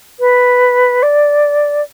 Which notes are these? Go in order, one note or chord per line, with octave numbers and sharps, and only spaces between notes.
B4
D5